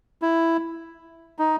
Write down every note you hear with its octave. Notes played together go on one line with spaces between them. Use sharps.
E4
D#4